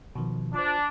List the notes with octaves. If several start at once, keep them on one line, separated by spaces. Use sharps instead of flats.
B2 D#3 F3
D4 F4 C5